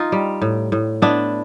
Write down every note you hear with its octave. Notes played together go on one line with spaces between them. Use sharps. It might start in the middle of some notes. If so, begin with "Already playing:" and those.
Already playing: D#4 F4
G3
A2
A2
B3 D4 E4